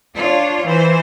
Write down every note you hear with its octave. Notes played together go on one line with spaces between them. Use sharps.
D4 F4 C#5
E3 C5